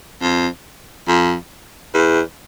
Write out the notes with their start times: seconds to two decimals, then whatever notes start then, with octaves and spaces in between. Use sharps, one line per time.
0.22 F2
1.08 F2
1.94 E2